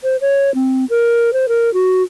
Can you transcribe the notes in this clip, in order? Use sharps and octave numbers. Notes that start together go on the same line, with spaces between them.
C5
C#5
C4
A#4
C5
A#4
F#4